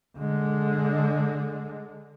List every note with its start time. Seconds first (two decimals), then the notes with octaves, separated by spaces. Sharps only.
0.17 D3 G#3